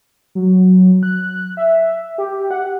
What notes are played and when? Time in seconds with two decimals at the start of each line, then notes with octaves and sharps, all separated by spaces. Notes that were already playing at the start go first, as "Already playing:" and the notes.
0.35 F#3
1.03 F#6
1.57 E5
2.18 G4
2.51 F#5